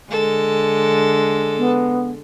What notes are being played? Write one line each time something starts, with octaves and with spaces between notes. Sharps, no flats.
D3 G#3 A4
B3